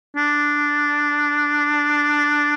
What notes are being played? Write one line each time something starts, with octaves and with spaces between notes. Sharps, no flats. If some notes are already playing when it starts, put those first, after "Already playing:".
D4